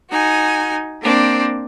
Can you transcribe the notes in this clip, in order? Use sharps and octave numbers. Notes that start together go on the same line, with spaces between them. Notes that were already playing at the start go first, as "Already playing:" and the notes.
D#4 F#4 G#5
A#3 C4 D4